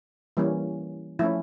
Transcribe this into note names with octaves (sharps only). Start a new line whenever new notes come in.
E3 G3 A#3 C#4
F3 A3 C#4 E4